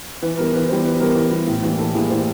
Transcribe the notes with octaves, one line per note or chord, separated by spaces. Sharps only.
E3 B4
G3 B3 A#4
E3 B4
G3 B3 C5
E3 B4
G3 B3 A#4
E3
G3 B3
A2
E3 G3 A#3
A2 A4
E3 G3 A#3 G#4
A2 C5